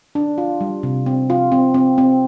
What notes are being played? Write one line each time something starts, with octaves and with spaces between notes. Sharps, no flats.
D4
F4
G3
C3
C4
F4
C4
C4
C4